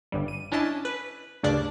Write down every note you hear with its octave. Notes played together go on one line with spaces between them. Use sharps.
G1 G2 G3
D#7
C#4 D4 E4 D#5 A5
B4
D2 G2 C#3 D4 D5 A5